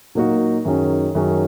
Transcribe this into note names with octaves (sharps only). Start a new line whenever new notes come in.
A#2 F#3 A#3 D#4 F#4
F#2 D#3 F#3 C#4 G#4
F#2 D#3 F#3 C#4 G#4